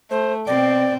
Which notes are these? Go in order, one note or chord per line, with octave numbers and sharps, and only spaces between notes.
A3 C5
B2 C4 D5 G5